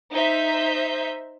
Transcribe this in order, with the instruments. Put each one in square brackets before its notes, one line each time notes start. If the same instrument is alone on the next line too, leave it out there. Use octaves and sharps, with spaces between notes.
[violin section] D#4 C5 E5 G6 B6